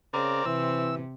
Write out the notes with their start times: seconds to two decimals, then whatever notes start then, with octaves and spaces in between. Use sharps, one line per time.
0.14 C#3 C4 A#4 D5
0.45 C3 E3 E6